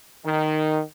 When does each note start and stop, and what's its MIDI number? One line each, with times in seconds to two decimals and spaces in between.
0.25 0.81 51